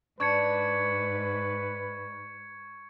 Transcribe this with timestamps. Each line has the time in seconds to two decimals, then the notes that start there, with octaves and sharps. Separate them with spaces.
0.20 G#2 D4 B4 C#6 G#6 C#7